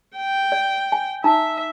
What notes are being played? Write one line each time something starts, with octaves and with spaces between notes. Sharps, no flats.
G5
D5
G#5
D#4 E5 G#5 A#5